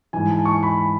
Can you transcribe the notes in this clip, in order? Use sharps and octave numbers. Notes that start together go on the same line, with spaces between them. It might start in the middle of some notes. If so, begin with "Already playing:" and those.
G#2 E3 G#5
A5
C#6
B5